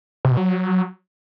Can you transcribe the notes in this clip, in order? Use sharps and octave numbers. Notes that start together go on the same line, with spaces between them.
C3
B2
F#3